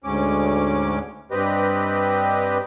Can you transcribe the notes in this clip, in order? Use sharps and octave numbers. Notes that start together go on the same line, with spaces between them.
D2 G#2 C#4 D6
G2 C4 G4 B4 D#5